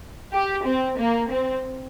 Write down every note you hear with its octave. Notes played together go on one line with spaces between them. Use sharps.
G4
C4
A#3
C4